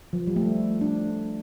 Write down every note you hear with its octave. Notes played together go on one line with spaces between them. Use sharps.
F3
G3
A3
D4